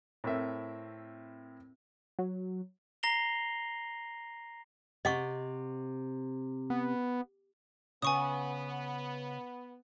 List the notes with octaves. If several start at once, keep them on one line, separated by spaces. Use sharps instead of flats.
A2 C4 E4 A#4 E5
F#3
A#5 A#6 C7 F7 G7
C3 D#5 F#5 C#6
B3
C#3 B3 G#5 C#6 D#6